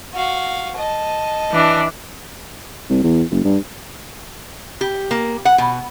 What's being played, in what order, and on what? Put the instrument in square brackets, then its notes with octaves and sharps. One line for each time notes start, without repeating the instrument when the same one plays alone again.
[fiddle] F#4 F5
D#5 A5
[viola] E3 D4
[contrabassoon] C2
E2
F#1
G2
[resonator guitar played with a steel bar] G4
A#3
F#5
B2